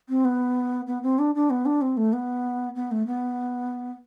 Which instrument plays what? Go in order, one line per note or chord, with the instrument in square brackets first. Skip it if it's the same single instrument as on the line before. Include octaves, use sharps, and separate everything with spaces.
[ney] C4
B3
B3
C4
D4
D4
B3
D4
C4
A3
B3
B3
A3
B3